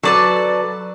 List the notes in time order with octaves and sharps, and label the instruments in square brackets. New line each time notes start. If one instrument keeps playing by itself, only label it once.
[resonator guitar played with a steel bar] F#3 B4 [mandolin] A4 D5 A5